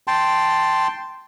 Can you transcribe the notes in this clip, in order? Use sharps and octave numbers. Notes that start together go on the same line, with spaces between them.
G5 A5 C6